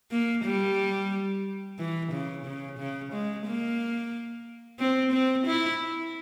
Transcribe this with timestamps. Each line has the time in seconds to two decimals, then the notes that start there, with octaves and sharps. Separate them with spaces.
0.11 A#3
0.45 G3
1.79 E3
2.12 C#3
2.45 C#3
2.79 C#3
3.13 G#3
3.46 A#3
4.79 C4
5.12 C4
5.46 E4